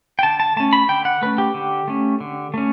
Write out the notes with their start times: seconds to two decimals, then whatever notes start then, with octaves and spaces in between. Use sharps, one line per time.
0.19 G5
0.23 D3 A5
0.40 A5
0.56 A3 C#4 A5
0.73 B5
0.89 D3 G5
1.05 F#5
1.22 A3 C#4 B4
1.38 G4
1.54 D3
1.88 A3 C#4
2.20 D3
2.54 A3 C#4